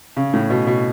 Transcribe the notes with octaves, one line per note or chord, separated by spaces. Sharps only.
C#3
A2
B2
B2